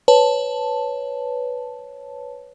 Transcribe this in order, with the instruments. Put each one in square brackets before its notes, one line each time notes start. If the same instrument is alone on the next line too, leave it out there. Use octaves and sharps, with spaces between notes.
[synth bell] B4 C#5 A5